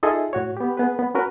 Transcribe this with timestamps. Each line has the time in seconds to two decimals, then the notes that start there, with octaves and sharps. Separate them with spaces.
0.03 D#4 F4 G#4 A4 D#5 E5
0.33 A2 F#4 C#5
0.57 B3 G4
0.77 B3 G#4 B4
0.99 B3
1.15 C#4 F#4 A#4 B4